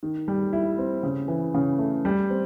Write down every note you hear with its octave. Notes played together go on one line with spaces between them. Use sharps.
D#3
G3
E4
C4
C#3
E3
C#3
A3
G3
C4